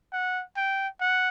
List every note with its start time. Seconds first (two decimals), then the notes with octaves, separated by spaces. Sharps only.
0.13 F#5
0.57 G5
1.01 F#5